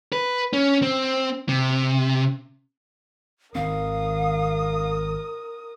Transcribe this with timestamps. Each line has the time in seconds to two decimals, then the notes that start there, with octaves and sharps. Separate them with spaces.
0.12 B4
0.53 C#4
0.82 C4
1.49 C3
3.55 G#1 D#3 C4 A#4 F5 D#6